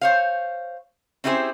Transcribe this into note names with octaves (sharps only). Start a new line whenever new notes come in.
C5 C#5 F5
C4 C#4 E4 G4 G#4 C5